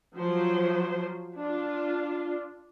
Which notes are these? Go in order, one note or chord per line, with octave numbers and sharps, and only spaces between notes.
F3 F#3 C5
D4 F4